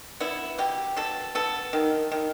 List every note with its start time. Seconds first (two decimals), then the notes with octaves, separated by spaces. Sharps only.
0.20 B3 E4
0.58 B2 G4
0.97 B2 A4
1.35 B3 A4
1.73 D#3
2.12 D#3